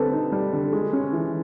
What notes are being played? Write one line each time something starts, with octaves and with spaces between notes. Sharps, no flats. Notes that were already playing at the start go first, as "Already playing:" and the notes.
Already playing: D3 G3 C4 A4 B4
D#4
G3
D3
G#3
C#4
E3